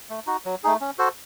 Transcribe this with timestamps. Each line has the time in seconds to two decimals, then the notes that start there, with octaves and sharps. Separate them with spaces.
0.10 A3
0.27 D#4 F#4
0.45 F#3
0.64 A3 D#4 G#4
0.81 C#4
0.98 F#4 A4 C5